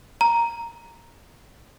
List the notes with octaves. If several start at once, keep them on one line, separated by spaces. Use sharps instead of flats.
A#5